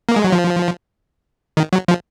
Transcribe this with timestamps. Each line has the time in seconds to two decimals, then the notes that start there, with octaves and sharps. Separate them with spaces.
0.09 A#3
0.16 G#3
0.24 F#3
0.32 F3
1.57 D#3
1.73 F#3
1.88 F3